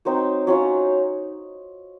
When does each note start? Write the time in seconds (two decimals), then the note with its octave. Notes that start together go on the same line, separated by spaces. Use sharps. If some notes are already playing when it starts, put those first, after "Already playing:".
0.05 F#3 C4 D#4 C5
0.47 F#3 C#4 F4